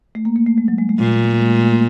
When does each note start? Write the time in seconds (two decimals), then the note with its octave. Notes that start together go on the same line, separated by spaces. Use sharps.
0.15 A3
0.25 A#3
0.36 A#3
0.47 A3
0.58 G#3
0.68 F#3
0.78 G#3
0.89 A3
0.99 A#2 A#3
1.40 G#3
1.62 A3
1.72 A#3